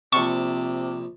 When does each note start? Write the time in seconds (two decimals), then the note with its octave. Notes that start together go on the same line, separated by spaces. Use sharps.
0.13 A#1 C3 A5 C#6